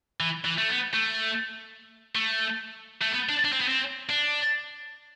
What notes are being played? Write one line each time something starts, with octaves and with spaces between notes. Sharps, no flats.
E3
E3
A3
B3
A3
A3
A3
B3
D4
D4
C4
B3
C4
D4